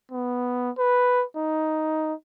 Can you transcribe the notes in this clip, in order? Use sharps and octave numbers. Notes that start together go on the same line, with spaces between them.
B3
B4
D#4